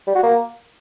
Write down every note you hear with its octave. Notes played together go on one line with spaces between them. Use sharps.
G3
F#4
A#3